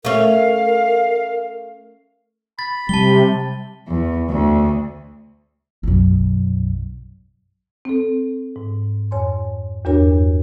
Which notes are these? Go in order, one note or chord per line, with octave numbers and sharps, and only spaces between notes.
A3 C#4 A#4 F5
B5 A6
C3 G3 A5 G7
E2
D2
B1 F#2
C4 A4
G#2
F2 C#5 G#5 C6
E2 G2 D4 F#4 A#4 C#5